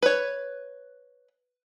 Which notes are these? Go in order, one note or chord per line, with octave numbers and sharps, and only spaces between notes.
B4 C#5